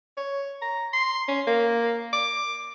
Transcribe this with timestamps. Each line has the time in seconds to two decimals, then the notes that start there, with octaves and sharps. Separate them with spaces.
0.17 C#5
0.62 A#5
0.93 C6
1.28 C#4
1.47 A#3
2.13 D6